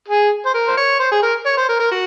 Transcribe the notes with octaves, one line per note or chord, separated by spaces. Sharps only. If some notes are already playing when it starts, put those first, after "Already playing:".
G#4
C5
A#4
C5
C#5
C5
G#4
A#4
C#5
C5
A#4
A#4
F#4